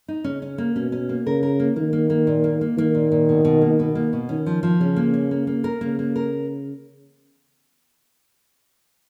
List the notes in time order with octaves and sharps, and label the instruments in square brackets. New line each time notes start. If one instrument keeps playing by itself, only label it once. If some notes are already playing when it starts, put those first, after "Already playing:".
[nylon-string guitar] D#4
[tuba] C#3 [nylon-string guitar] C#4
[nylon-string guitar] C#4
A#3
[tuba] B2 [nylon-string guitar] C#4
[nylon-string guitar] C#4
A#3
[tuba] C#3 [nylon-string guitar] A#4
[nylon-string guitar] A#4
A#3
[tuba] D#3 [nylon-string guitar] A#3
[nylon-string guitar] A#3
A#3
A#2
A#3
A#3
[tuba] D#3 [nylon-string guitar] A#3
[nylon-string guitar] A#2
A#2
B2
B2
A#3
B2
A#3
B2
[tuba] D#3 [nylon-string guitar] C#4
[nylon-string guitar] F3
F3
[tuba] C#3 [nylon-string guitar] C#4
[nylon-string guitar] A#3
C#4
A#3
A#3
A#4
[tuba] C#3 [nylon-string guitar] A#3
[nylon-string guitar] A#3
A#4